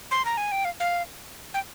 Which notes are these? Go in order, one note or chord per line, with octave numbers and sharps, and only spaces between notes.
C6
A#5
G#5
G5
F5
F5
G5